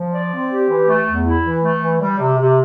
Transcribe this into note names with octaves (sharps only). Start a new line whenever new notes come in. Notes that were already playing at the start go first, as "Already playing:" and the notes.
Already playing: F3
D5
C4
G4
E3
A3
E2
E4
E3
A3
E3
G3
C3
C3